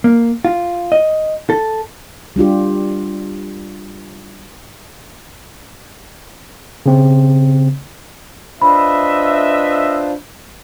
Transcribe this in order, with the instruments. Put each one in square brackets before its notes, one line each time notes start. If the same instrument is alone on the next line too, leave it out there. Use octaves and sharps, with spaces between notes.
[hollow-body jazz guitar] A#3
F4
D#5
A4
[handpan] G3 D4 F4 G4
[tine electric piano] C#3 C4
[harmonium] D4 F4 C5 [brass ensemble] B4 D#5 E5 [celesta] B5